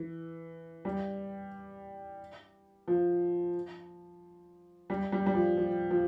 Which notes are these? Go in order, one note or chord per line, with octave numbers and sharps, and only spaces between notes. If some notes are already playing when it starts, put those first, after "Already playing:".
Already playing: E3
G3
F3
G3
G3
G3
F3
F3
F3